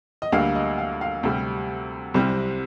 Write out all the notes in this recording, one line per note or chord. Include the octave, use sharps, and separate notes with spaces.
D#5
D2 D3 G3 A#3 F5
D#5
F5
F5
D2 C3 G3
C2 C3 G3 C4